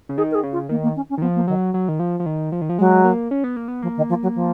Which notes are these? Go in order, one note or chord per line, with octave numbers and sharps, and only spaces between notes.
C#3
D#3 G#4
A#4
G#4
C#3
F4
D#3 A#3
A#3
C#4
C#4
D#3
F3 B3
A#3
D#3 F#3
F#3
D#3
F3
F3
D#3
F3
D#3
F3
F#3 G#3
A#3
C#4
B3
A#3
B3
F3 A#3
D#3
F3
F#3
F3